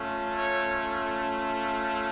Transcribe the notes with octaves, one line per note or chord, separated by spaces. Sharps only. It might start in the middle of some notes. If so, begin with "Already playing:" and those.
Already playing: A3 C#4 F4
C#5